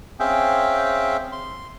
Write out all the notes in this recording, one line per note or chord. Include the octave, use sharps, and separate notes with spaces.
C4 C#4 G#4 E5 F5 G5
C6